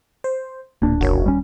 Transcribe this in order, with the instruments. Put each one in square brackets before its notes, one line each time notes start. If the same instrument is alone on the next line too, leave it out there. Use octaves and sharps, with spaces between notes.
[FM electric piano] C5
[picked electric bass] D1 D4 [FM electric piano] A#2
[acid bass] F#1 [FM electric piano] F#4 A#4 C#5
[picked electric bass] D#1 G3 C#4